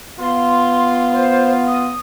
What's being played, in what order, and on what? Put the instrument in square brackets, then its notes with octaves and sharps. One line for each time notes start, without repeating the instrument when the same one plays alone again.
[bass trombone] B3 [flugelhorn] F4 [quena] C6
[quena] C5
D#6